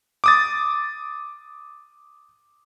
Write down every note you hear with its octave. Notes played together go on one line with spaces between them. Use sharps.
D6 D#6 A6